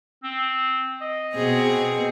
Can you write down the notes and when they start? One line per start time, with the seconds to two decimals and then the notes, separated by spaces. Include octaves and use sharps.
0.23 C4
1.01 D#5
1.35 B2 C4 G#4